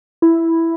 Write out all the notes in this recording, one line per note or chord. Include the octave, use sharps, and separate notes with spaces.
E4